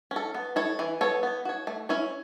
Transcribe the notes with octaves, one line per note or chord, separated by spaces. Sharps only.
C#4
A4
B3
E4 A4 C#5
E3
B3 A4 C#5
B3
F#4 C#5
A3
C#4 E4 C#5